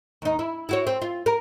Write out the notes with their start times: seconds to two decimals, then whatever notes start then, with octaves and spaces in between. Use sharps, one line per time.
0.22 D#2 D#4
0.39 E4
0.69 E4 F#4 C#5
0.87 C4
1.02 F4
1.26 A#4